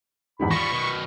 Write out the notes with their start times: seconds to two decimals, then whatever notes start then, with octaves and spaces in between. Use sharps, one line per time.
0.40 E2 G#2 D#3 B5
0.51 F3 G3 C#6 A#6
0.71 B2 D#3